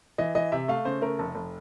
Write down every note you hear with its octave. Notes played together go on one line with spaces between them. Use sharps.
E3 D#5
E3 D#5
C3 E5
A3 F5
C#3 C5
A3 A#4
F1 A4
F1